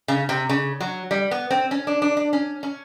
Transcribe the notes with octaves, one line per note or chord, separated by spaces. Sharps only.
C#3
C3
C#3
F#3
G3
B3
C4
C#4
D4
D4
D4
C#4
C#4